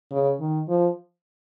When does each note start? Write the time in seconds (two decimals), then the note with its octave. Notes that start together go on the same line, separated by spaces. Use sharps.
0.12 C#3
0.40 D#3
0.68 F3